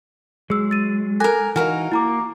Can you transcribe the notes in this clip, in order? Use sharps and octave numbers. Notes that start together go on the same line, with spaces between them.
F#3 G#3 G#4 E6
A6 D#7
A4 A#4 G#5 F#6 A#6
E3 D#4 F#4 A#4 F5 G#5 F6
A#3 E4 A#5 D6